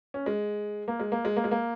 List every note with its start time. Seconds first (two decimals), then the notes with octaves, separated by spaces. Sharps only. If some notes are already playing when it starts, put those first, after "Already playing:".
0.14 C#4
0.26 G#3
0.88 A#3
1.00 G#3
1.12 A#3
1.25 G#3
1.36 A#3
1.44 G#3
1.51 A#3